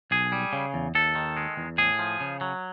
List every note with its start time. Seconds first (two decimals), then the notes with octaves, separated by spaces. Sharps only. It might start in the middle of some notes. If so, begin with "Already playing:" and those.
0.11 B1 G#4
0.32 G3
0.53 C#3
0.74 E2
0.95 D#2 A4
1.15 D#3
1.37 G#3
1.57 E2
1.78 A2 G#4
1.99 F3
2.21 C#3
2.41 F#3